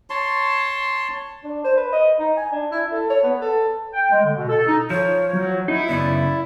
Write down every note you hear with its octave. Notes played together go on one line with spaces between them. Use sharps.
C#5 A5 C6
D4
C5
B4
D#5
D#4
G#5
D4
E4
A4
C#5
B3
A4
G5
G#3
D3
B2
A4
D#4
F3 C#5
F#3
D#4 E4
F#2 C#3 B3 D5